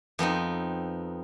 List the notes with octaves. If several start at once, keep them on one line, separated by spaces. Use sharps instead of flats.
F2 B3 C4 D#4